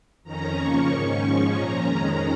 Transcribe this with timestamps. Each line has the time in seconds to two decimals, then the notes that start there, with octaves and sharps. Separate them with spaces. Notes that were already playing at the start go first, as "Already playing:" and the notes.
0.23 F2 D#3 C#4 A#5
0.56 C#3 F3 A#3 C#4 C#6
0.89 G#2 D#3 C#4
1.21 G#2 F3 G#3 C#4
1.53 A#2 F3 C#4 A#5
1.85 F2 D#3 G#3 C#4 A#5